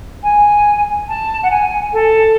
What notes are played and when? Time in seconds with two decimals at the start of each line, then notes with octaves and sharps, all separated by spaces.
0.23 G#5
1.08 A5
1.43 F#5
1.51 G#5
1.93 A4